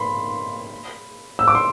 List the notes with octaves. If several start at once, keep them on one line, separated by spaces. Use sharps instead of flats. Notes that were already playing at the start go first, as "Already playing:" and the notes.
Already playing: B5 C6
E6
D6
C6